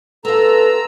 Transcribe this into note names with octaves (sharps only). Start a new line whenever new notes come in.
B3 F4 A4 A#5 E6